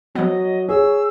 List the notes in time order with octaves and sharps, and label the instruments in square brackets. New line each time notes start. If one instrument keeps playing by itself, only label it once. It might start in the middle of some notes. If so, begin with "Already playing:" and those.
[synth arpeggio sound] F3 B3 [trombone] F#3 [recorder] D#5
[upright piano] G#4 [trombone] C#5 [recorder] E6